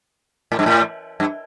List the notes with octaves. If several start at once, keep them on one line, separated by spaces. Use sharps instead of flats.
A2
G2
A2
G2